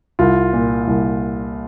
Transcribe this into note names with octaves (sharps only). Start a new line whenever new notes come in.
C2 F4
A#2
C2